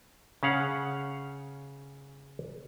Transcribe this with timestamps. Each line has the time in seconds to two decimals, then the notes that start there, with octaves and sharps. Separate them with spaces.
0.43 C#3 C#4 F5 F#5